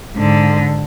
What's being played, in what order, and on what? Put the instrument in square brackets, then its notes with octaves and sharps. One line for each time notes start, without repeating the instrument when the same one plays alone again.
[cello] G#2 D3